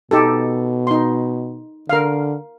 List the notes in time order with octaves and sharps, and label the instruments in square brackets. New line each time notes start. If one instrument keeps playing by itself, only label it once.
[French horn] B2 [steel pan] D#4 G4 A4
[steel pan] D#4 C6
[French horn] D3 [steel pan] A#4 F5